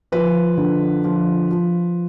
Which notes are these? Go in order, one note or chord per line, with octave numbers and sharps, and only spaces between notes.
F3 B4
D3
F3
F3